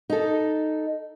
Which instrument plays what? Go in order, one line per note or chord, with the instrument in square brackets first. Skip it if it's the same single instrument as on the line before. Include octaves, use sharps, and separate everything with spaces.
[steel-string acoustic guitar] D#4 A4